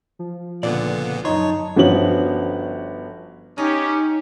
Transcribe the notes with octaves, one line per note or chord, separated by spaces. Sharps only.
F3
C#2 A#2 D3 B3 D5
F#2 D#4 C#5 A5 C6
G1 F3 B3 C#4 F#4 F#7
C#4 D#4 G4